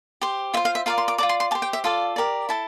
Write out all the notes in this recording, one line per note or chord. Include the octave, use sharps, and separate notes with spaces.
G4 C5
F4 C5 E5
F5
E5
F4 A#4 D5 F5
C6
D6
F4 A#4 D5 D6
C6
C6
G4 C5 A5
G5
E5
F4 A4 D5 F5
G4 A#4 D5
E4 A4 A5